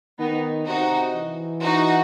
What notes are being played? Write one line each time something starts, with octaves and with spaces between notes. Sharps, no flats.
D#3 B3 D#4
C3 D#4 F#4
E3
D#4 F#4